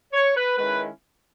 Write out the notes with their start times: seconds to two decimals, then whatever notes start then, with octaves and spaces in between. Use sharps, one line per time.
0.13 C#5
0.36 B4
0.58 D#3 G#3 C#4 E4 B4